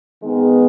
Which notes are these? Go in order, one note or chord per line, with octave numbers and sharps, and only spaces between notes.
D#3 G#3 B3